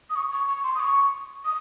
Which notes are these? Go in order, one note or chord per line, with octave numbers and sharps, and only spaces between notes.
D#6
C#6
C#6
C#6
C6
D#6
C#6
D#6